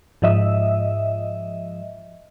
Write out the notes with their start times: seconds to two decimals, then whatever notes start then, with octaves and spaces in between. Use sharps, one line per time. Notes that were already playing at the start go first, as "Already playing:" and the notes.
0.22 G#2 F3 D#5 E5